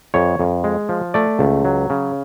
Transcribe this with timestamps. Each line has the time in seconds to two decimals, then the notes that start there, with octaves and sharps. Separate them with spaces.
0.14 F2 C#5
0.39 F2
0.64 G#3
0.89 F3
1.14 A3 D5
1.39 C#2
1.65 F#3
1.90 C#3